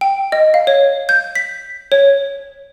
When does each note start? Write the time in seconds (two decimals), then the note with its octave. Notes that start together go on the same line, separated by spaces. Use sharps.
0.01 G5
0.32 D#5
0.54 F5
0.67 C#5
1.09 G6
1.35 B6
1.92 C#5